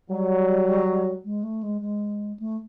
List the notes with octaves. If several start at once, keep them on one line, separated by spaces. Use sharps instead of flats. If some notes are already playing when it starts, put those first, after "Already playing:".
F#3 G3
G#3
A3
G#3
G#3
A3